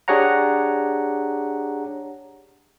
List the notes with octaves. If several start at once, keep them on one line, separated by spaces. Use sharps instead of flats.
D4 G4 G#4 C#5 F#5 A#5